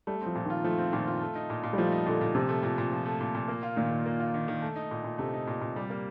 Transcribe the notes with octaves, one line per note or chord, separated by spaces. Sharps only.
G3 A3
C4
F3
A#2
D#3
F4
F3 A3
C4
A#2 D#3
F4
A3
D#4
A#2
A#2
G3
F3 A3
D#4
A#2 D3
A#2
C3 F3
A3
A#2
A#2
F3
A3
A#2
A#2
A#3
F4
A#2 D#3
D#3
A#3
F4
D#3
D#3
A3
D#4
A#2
A#2
C3 A3
D#4
A#2
A#2
G3
A#3